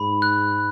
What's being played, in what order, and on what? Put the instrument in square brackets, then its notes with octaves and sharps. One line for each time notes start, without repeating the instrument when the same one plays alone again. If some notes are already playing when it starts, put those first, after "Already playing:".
Already playing: [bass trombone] G#2 [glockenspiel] B5
[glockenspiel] F#6